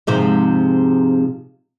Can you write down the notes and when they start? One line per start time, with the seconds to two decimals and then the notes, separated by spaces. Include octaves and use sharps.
0.07 G#2 C3 F3